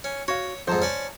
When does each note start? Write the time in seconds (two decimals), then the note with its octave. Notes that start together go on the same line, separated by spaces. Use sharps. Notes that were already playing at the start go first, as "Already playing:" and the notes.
0.04 C#4
0.28 F#4 C#5 F5
0.68 F2 G#2 C5 A5 A#5
0.82 C#4 D5